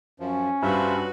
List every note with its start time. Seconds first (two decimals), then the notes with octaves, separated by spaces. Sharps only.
0.20 F#2 F3 C#4
0.63 G2 F4 F#4 B4 C5 E5